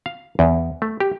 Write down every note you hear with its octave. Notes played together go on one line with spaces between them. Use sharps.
F5
E2
A3
G4